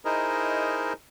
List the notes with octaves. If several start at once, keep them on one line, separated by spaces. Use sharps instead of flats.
D#4 E4 G#4 A#4 C5 D#5